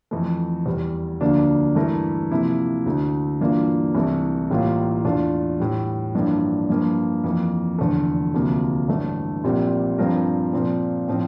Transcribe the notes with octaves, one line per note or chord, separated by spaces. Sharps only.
F2 E3 A3
E2 E3 G3
D2 D3 F3 A#3 D4
G2 E3 A3 E4 A#4
C3 F3 A#3 E4
D2 D3 A3
G2 E3 A#3 D4 F4
C2 C3 E3 A3
A1 A2 G3 A#3 F4
E2 E3 A3 D4 F4
A2 E3 G3
A1 G2 F3 A#3 D4
G2 F3 A#3
F2 E3 A#3
F1 E2 D3 A3
D2 C3 F3 A#3
A1 G2 D3 A3
A#1 A#2 G3 C4 G4
G2 F3 C4 F4 A#4
A#2 F3 C4
A2 F3 C4